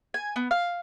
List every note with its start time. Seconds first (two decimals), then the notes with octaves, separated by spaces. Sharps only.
0.14 G#5
0.36 B3
0.51 F5